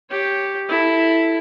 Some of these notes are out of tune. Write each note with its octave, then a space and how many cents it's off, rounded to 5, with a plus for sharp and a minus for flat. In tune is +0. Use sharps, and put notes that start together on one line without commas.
G4 +0 C#5 +0
E4 +0 A4 +0